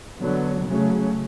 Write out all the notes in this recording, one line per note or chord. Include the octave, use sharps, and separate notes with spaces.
D3 F#3 B3
C#3 F#3 A3 C#4